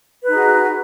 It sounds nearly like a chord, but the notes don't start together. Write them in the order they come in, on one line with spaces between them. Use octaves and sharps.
B4 D#4 G#4 F#4